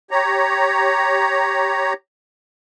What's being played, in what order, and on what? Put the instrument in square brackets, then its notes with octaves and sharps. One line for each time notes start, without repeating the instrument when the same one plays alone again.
[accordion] G4 C#5 A#5